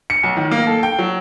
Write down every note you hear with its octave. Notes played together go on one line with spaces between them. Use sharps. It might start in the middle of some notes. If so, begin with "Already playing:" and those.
C#7
B1
D#3
A#3
A4
G5
F#3